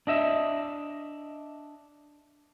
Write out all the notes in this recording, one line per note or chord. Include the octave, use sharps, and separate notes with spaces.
D4 D#5 E5